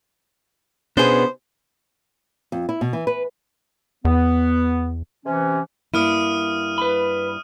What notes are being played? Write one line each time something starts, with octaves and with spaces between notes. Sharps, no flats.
B2 B3 C#4 D4 G#4 C5
F2
E4
B2
E3
B4
E2 B3
C3 E3 C#4
G2 A#3 E4 D#6 F6 D#7
B4 B5